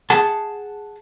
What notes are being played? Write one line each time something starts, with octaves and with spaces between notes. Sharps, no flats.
G#4 F#5 A5